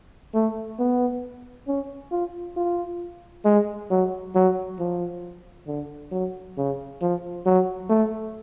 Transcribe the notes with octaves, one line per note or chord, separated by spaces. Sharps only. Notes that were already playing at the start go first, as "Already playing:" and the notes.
A3
B3
C#4
F4
F4
G#3
F#3
F#3
F3
D3
F#3
C#3
F3
F#3
A3